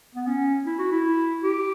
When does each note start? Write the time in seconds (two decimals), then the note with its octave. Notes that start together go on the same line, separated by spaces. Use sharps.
0.15 B3
0.27 C#4
0.66 E4
0.79 F#4
0.92 E4
1.44 G4